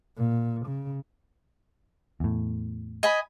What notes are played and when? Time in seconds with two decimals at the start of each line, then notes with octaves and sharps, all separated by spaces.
0.17 A#2
0.66 C#3
2.20 E2 A2
3.03 D#5 G#5 B5